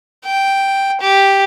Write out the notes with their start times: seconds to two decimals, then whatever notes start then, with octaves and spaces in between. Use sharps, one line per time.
0.24 G5
1.01 G4